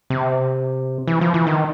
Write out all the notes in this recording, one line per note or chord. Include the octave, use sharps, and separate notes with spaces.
C3
E3
F3
E3
D#3